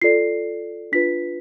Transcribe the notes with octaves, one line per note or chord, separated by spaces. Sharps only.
F4 A4 D5 C7
D4 F4 B4 B6